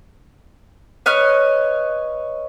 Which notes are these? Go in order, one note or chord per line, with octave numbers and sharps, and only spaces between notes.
B4 C#5 D#5 F6